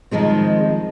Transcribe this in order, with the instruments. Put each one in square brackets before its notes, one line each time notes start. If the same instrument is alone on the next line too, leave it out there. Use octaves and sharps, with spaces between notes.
[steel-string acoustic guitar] D#3 F3 G#3 C4